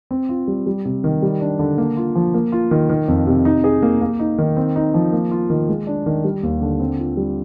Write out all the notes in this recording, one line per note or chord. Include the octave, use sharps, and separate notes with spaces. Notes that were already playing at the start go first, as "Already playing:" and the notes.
C4
F4
G3
G3
C3
D#3
G3
D4
D3
A#3
F4
F3
A#3
F4
D#3
D#3
F2
C3
D#4
G#4
A#3
A#3
D#4
D#3
C4
D#4
F3
A#3
F4
D#3
G#3
D4
D#3
G3
D#2
D3
C4
F4
G3